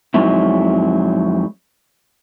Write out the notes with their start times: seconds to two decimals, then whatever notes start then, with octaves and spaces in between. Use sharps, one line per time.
0.14 F2 F#3 G#3 C4 D#4 E4